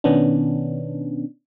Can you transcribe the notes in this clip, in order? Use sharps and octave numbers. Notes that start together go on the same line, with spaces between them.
B2 D#3 B3 C#4 D4